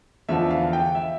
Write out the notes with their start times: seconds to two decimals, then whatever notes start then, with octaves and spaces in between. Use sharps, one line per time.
0.29 E2 D3 F3 E5
0.51 F5
0.73 G5
0.95 E5